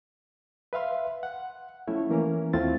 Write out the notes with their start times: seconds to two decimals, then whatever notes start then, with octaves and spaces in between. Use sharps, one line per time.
0.73 B4 E5 F5 C6
1.23 F#5
1.87 F3 A3 C#4 E4 C#5
2.10 E3 A#3 C#4 A#4
2.53 D#2 A3 C4 E4 F4 A6